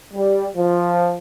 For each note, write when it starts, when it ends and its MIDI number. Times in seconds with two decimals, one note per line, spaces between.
0.14 0.47 55
0.56 1.16 53